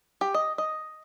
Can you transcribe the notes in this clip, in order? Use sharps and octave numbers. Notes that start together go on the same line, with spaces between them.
G4
D#5
D#5